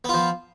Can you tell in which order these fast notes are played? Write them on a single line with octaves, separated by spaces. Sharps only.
B3 F4 F3